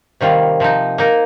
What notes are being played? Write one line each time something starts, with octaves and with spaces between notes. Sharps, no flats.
C3 D#3 G3 A#3 F4
C3 F3 D#4
A#3 D#4 A#4